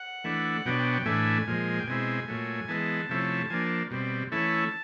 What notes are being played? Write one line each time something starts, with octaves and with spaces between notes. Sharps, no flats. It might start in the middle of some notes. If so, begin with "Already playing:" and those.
Already playing: F#5
E3 A3 D4
B2 F#3 B3 D4 G5
G5
G5
A2 E3 A3 D4 G#5
A#2 F3 G#3
G5
B2 G#3 C4 E4 G#5
A#2 F#3 A3
E3 G#3 B3 A5
C3 F3 A3 C#4 E4
F3 A#3 D4 G#5
A5
B2 G3 C4
E3 A3 C#4 E4 A5